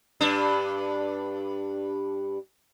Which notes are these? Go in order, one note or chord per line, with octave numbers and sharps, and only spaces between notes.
G2 D4